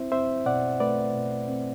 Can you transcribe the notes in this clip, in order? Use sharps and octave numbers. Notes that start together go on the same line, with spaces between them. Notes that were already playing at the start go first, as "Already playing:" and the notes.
Already playing: C4 E4 C5 E5
C4 C5 E5
B2 D5 F#5
A3 B4 D5
B2
C4